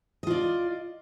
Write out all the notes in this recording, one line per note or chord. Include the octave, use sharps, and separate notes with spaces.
F4 D5 D#5